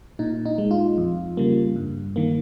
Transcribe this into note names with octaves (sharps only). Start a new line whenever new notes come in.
A#2 D#4
D#4
G#3
F4
F2
C#3 G3 A#3
G2
D#3 A#3